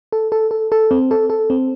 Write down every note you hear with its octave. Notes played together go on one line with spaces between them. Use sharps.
A4
A4
A4
A4
C4
A4
A4
C4